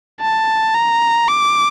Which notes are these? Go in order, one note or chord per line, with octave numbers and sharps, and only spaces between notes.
A5
A#5
D6